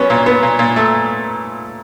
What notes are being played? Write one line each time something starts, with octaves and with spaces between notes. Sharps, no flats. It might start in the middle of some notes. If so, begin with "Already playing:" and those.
Already playing: F#3 B3 C#4 C#5
A#2
B3
A#2
A#2
A3